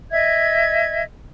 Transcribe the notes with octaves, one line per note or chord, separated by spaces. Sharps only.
D#5 E5 G#6